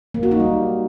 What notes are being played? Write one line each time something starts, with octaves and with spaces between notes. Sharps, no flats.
A#3
F#4
D#4
G3